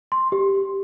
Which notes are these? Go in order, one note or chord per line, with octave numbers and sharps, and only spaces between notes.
C6
G4